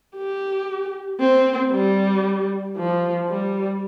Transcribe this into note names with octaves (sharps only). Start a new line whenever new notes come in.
G4
C4
G3
F3
G3